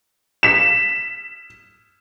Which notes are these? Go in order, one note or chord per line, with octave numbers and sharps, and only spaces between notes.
B6 E7